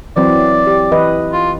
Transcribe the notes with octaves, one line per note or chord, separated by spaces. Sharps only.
E3 F#3 C4 D5
G4
E3 B4 D#5
F4